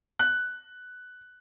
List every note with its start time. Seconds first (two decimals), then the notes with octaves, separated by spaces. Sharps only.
0.19 F#6